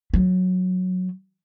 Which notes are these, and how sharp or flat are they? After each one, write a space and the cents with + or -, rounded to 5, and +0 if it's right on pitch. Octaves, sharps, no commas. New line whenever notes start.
F#3 -10